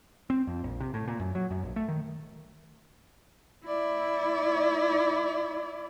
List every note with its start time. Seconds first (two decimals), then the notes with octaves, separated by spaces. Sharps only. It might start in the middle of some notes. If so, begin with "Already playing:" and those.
0.30 C4
0.47 F2
0.64 A#1
0.80 C3
0.94 A2
1.08 A#2
1.20 F#2
1.35 F#3
1.51 F#2
1.63 A#1
1.76 A3
1.88 D#3
3.65 E4 D5